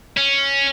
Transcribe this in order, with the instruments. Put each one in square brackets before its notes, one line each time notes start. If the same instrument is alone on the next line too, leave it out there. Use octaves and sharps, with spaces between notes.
[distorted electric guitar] C#4